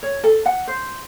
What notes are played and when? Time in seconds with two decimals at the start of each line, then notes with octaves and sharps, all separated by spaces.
0.03 C#5
0.24 A4
0.46 F#5
0.68 C5